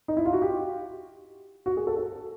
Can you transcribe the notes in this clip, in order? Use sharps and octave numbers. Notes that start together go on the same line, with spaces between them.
D#4
E4
F4
F#4
G4
F#4
G#4
A4
A4